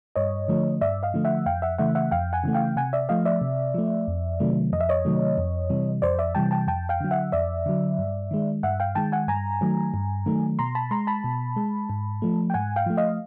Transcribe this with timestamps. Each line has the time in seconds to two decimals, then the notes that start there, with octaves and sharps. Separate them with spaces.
0.16 G2 C#5 D#5
0.48 D3 F3 A3
0.81 G2 D5 E5
1.03 D#5 F5
1.14 D3 F3 A3
1.25 E5 F#5
1.46 F2 F5 G5
1.62 E5 F#5
1.78 C#3 E3 A3 E5 F#5
1.95 E5 F#5
2.11 F2 F5 G5
2.33 F#5 G#5
2.44 C#3 E3 A3
2.54 F5 G5
2.76 C3 F#5 G#5
2.93 D5 E5
3.09 F3 A3 D#5 F5
3.25 D5 E5
3.41 C3
3.74 F3 A3
4.08 F2
4.40 C3 D#3 F#3 A3
4.72 F2 D#5
4.81 E5
4.89 C#5 D#5
5.05 C3 D#3 F#3 A3
5.38 F2
5.70 C3 E3 G3
6.02 F2 C5 D5
6.19 D5 E5
6.35 C3 E3 G3 G5 A5
6.51 G5 A5
6.67 F2 G5 A5
6.89 F5 G5
7.00 D3 F#3
7.11 E5 F#5
7.32 F2 D5 E5
7.66 D3 F#3
7.99 G2
8.31 D#3 G#3
8.63 G2 E5 F#5
8.80 F5 G5
8.95 D#3 G#3 G5 A5
9.12 F#5 G#5
9.28 G2 G#5 A#5
9.61 D#3 F#3 A3
9.94 G2
10.26 D#3 F#3 A3
10.59 B2 A#5 C6
10.75 A5 B5
10.91 G#3 A#5 C6
11.07 A5 B5
11.24 B2
11.56 G#3
11.90 G#2
12.22 F3 A3
12.50 G5
12.54 G#2 F#5 G#5
12.76 F5 G5
12.86 F3 A3
12.97 D#5 F5